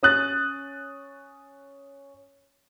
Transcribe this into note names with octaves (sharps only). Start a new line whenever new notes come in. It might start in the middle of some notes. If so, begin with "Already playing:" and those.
C#4 D#6 F#6 A6